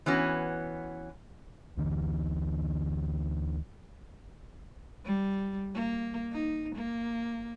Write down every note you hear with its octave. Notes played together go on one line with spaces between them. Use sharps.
E3 B3 C#4 F#4
D2 D3 E3
G3
A#3
D#4
A#3